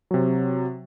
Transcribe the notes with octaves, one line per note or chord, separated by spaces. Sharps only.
C3 F#3